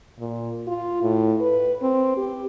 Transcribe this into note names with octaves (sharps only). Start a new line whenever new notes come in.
A#2
F4
A2
B4
C4
G4